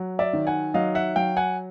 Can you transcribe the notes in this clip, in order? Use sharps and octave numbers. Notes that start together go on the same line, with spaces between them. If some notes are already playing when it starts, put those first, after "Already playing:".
Already playing: F#3
D5 E5
D#3
F#5 G#5
F#3 D#5 F5
E5 F#5
F#3 F5 G5
F#5 G#5